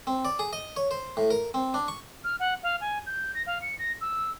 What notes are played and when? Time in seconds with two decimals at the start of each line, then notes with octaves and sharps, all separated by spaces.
0.07 C4
0.25 D5
0.39 G#4
0.53 D#5
0.76 C#5
0.91 C5
1.17 A2
1.31 A#4
1.54 C4
1.74 D4
1.88 C#6
2.24 F6
2.40 F#5
2.63 F5
2.81 G#5
3.06 G6
3.35 A#6
3.47 F5
3.62 C#7
3.79 A#6
4.01 E6